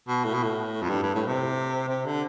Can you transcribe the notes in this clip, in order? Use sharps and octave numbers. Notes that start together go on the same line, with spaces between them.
B2
A2
B2
A2
F2
G2
G2
A2
C3
C3
D3